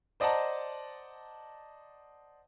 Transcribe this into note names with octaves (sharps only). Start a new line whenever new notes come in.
C5 D5 D#5 F#5 A5 A#5